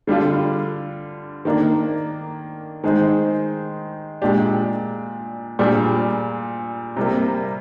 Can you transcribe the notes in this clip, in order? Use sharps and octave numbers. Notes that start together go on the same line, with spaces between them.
D3 G3 D4 F4
D#3 A#3 D4
D#3 G#3 D#4 G#4 C5
A#2 G#3 D4 G4
A#2 G3 D4 G#4
C3 G3 A#3